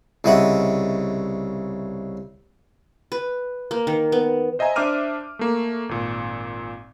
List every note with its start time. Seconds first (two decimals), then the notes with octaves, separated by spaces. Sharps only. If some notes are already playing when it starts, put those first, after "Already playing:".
0.24 C2 C#3 D#5 E5 F#5
3.12 B4
3.71 A#3
3.87 D#3
4.12 B3
4.59 C5 D#5 E5 G#5 A#5
4.76 D4 C5 E5 D6 F6 D#7
5.39 A3 A#3
5.89 G#1 A#2